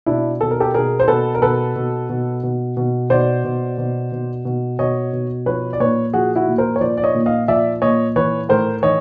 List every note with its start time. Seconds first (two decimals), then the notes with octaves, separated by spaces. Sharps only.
0.06 B2 D4 E4
0.41 B2 A4
0.51 A#4
0.60 G4 A4
0.74 B2 G#4 A#4
1.00 C5
1.08 B2 A4 B4
1.35 A#4
1.42 B2 A4 B4
1.76 B2
2.09 B2
2.43 B2
2.77 B2
3.10 B2 C5 D5
3.44 B2
3.78 B2
4.12 B2
4.45 B2
4.79 B2 C#5 D#5
5.13 B2
5.46 F3 B4 C#5
5.73 D5
5.80 A#2 B4 C#5
6.13 F3 F#4 G#4
6.36 E4 F#4
6.48 A#2
6.58 A#4 C5
6.76 C#5
6.81 F3 C5 D5
6.97 D5
7.03 C#5 D#5
7.14 A#2
7.26 D#5 F5
7.48 F3 D5 E5
7.82 A#2 C#5 D#5
8.16 E3 B4 C#5
8.49 A2 A#4 C5
8.83 E3 C#5 D#5